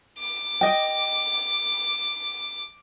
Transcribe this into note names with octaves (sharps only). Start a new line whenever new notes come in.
D6
D#5 G5